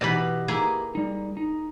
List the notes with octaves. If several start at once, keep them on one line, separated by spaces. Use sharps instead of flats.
B2 E3 G4 B4 D#5 B5
A#3 E4 G#4
G3 D#4
D#4